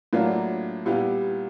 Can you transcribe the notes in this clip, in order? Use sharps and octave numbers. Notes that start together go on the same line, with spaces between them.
A2 F#3 A#3 D4 F4
A#2 G3 B3 E4 G4